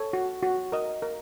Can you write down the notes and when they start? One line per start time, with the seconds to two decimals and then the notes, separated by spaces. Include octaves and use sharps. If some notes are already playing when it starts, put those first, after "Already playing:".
Already playing: A4 C#5
0.13 F#4
0.43 F#4
0.72 A#4 D#5
1.02 A#4